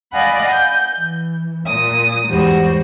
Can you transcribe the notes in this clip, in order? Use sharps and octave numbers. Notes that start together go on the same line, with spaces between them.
D5 D#5 F5 F#5 G#5 B5
G6
E3
A#2 D#6
E2 G#2 G3 F#4 C5